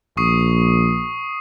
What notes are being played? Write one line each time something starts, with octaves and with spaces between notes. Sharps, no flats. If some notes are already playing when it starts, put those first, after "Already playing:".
A#1 C#6 D#6 C7